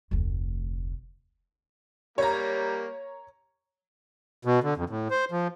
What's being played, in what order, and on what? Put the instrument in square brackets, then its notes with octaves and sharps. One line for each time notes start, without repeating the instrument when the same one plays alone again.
[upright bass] F1 D2
[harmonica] G3 A#3 [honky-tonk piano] C#5 A#5
[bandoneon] B2
D3
F2
A2
C5
F3